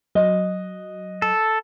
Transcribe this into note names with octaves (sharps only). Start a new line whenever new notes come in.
F#3 D#5
A4